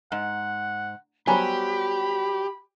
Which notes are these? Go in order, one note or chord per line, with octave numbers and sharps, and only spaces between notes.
G#2 F#5
F#3 G3 B3 G4 C5 G#5 B5